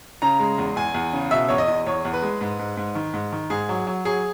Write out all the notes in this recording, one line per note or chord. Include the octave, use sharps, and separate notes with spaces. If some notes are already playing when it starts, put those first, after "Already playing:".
C#3 A#5
G#3
E2
E2 G#5
E2
C#3
B2 E5
E2 C#5
D#5
E2
E2 C#5
E2
B4
G#3
G#2
G#2
G#2
D#3
G#2
D#3
G#2 G#4
F#3
F#3
F#3 G#4